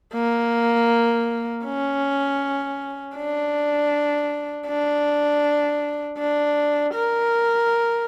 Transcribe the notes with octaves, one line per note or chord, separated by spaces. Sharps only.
A#3
C#4
D4
D4
D4
A#4